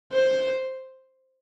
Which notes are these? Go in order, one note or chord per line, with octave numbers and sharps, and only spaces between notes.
C5